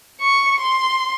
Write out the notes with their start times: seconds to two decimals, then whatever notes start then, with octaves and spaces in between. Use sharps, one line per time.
0.21 C#6
0.61 C6